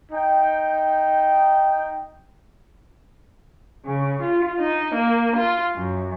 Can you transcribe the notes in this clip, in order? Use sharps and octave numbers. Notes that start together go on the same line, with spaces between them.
D#4 G5
C#3
F4
D#4
A#3
F4
F#2